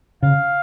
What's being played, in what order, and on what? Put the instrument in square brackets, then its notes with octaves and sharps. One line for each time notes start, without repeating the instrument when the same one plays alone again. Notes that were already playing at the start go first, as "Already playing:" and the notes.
[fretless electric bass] C#3 [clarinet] F5